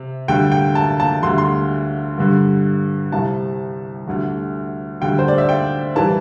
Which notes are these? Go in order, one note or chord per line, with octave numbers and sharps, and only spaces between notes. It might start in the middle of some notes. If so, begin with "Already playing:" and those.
Already playing: C3
D2 D3 G3 G5
G5
A5
A5
D2 D3 G3 C6
C6
G2 D3 G3
C2 C3 G3 A5
D2 D3 G3
D2 D3 G3 G5
C5
D5
E5
G5
E3 G3 A5